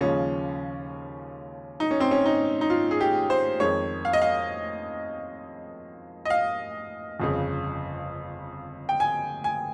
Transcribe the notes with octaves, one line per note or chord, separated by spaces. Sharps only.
D#2 C#3 F3 G#3 C#4
D#4
C#4
C4
C#4
D#4
D#4
F4
G#4
G4
C5
F2 D#3 G#3 C#5
F5
D#5
F5
D#5
F5
G1 F2 C#3
G5
G#5
G#5